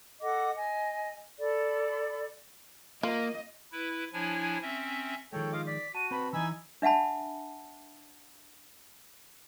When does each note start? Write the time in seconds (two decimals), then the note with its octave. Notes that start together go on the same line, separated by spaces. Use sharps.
0.22 A4 D#5 F#5 D6
0.56 D#5 G#5
1.39 A4 D5 B5
3.03 A#3 F4 D#5
3.72 E4 B4
4.13 F3 D4 E4 C#5 G#5
4.62 C4 C#4 E5
5.33 D#3 F3 G#3 A4 C#5 G5
5.52 F4 D#5 F5 D6
5.67 D5 B6
5.95 F#4 A5 D#7
6.11 C4 B4 A5 B5
6.33 D#3 E3 D#4 G#5 B5 E6
6.82 D4 E5 F#5 A5 B5